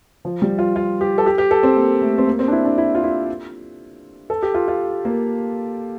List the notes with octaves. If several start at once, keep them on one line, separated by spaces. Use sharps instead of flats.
F3
G3
F4
F4
G4
A4
G4
G4
A4
C4
A#3
A3
C4
A#3
C4
D4
E4
D4
E4
F4
E4
A4
G4
F4
F4
A#3